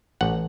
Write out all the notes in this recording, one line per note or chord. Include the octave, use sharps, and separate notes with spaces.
A1 F#5